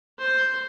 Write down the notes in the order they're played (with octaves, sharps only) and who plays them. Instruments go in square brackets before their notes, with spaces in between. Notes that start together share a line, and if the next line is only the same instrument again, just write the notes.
[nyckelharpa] C5